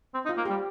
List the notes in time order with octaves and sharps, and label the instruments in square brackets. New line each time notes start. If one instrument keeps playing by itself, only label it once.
[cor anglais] C4
D#4
[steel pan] F4
[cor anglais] A#3
[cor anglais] G3 [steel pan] G4